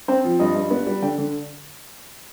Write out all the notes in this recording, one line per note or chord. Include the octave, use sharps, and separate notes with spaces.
C4 C5
F3
G2 D#5
G2
B3
G3
D3 G5
D3